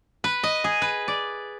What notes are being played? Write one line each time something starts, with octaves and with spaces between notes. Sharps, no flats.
B4
D#5
G#4
B4
D5